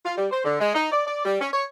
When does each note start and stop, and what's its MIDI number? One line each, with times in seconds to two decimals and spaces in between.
0.05 0.15 65
0.17 0.27 55
0.31 0.41 72
0.44 0.57 50
0.60 0.72 56
0.75 0.88 63
0.91 1.04 74
1.06 1.22 74
1.25 1.37 55
1.41 1.49 61
1.53 1.66 73